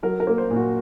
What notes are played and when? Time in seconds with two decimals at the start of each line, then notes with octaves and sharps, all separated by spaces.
0.03 F#3 A#4
0.20 A#4
0.27 A#3
0.38 C5
0.51 A#2
0.56 F#4